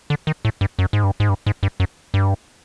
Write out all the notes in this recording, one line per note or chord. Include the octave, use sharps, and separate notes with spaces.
D3
D#3
A2
G2
F#2
G#2
G2
G#2
G2
G#2
G2
F#2
G2